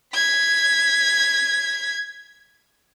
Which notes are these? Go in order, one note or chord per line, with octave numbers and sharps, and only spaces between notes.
G#6 B6